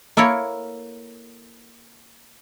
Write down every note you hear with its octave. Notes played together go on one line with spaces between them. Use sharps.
A#3 E4 A4 A#4 C#5